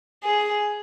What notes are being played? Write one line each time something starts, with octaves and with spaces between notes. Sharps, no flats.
G#4